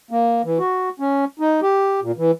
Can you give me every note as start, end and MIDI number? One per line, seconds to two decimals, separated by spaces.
0.11 0.42 58
0.44 0.58 52
0.59 0.89 66
1.00 1.25 61
1.40 1.60 63
1.62 2.00 67
2.02 2.12 46
2.17 2.31 52